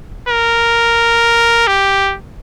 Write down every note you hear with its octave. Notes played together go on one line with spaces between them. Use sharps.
A#4
G4